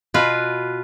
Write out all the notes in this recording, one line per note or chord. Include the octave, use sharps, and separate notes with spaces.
B2 F4 B4